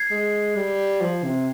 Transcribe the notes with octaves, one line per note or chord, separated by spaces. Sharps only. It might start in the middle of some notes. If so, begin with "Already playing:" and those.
Already playing: G#6 C7
G#3
G3
F3
C3